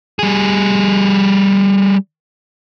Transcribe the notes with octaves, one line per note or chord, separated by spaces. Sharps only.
G3 G#4